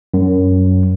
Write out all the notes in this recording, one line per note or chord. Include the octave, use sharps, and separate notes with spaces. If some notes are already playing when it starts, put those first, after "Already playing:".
F#2